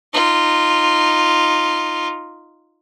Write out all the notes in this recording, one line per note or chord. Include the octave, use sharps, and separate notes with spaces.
D#4 F4